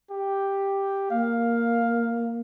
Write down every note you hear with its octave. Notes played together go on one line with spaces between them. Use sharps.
G4
A#3 F5